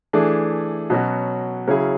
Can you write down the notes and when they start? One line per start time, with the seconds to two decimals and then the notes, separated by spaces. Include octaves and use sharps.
0.13 E3 A3 D4 G#4
0.90 B2 F#3 C#4 F#4
1.67 C#3 F#3 C#4 E4 G#4